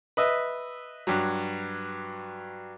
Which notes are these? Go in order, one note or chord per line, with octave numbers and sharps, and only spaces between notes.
B4 D#5 E5
G2 F#3